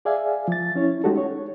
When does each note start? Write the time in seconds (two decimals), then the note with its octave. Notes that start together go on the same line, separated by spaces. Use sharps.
0.05 G#4 D5 E5 F5 G#5
0.48 F3 A6
0.76 C#4 E4 C#5
1.04 G#3 D#4 F#4 G4 A4
1.18 C#5